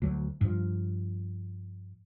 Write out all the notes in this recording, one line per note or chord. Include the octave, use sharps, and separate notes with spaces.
D2 F#3
G2 F3